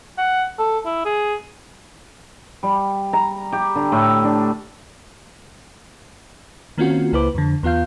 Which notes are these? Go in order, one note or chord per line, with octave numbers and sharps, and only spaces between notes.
F#5
A4
E4
G#4
G3
A#5
G4
D3
A2
D4
D#3 A#3 C4 C#4 F4 F#4
C#2 A#3 E4 B4 C5 D6
F2 D3
E2 B3 F4 F5 G6